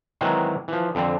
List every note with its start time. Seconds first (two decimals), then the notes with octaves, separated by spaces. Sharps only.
0.21 D#3 E3 F#3 G#3 C4 D#4
0.68 E3 F3
0.95 F2 D3 C4